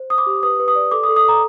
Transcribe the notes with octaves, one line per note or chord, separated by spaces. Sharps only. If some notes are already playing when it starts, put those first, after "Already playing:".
Already playing: C5
C5 D#6
D6
G4
B4 D#6
B4
D#6
D5
A4 D6
D#6
A4
D#6
A4 A#5